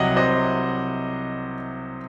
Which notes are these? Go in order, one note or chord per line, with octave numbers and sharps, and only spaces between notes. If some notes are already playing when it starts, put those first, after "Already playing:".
Already playing: C2 C3 F#3 D#5 F#5
C5 D#5